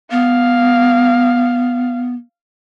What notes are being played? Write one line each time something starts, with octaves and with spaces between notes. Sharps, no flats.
B3 F5